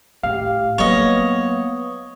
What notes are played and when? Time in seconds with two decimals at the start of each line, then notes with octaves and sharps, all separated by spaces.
0.23 A2 G4 F5
0.78 F#3 A#3 B3 C#5 D#5